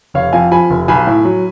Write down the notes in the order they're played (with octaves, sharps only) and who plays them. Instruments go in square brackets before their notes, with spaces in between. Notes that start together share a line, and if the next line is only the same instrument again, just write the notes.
[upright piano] F1 C#5 F5
F2 F5 G#5
F3 G#5 B5
F1
B1 G#5 B5
A2
F#3